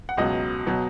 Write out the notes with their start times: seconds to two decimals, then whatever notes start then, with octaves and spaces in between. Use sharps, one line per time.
0.09 F#5
0.17 C#2 B2 F#3 D#5
0.66 B2 F#3